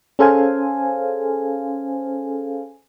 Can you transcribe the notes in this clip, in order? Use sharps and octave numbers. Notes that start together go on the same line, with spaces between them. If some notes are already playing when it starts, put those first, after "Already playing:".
C#4 G#4 A4 C5 F5 G#5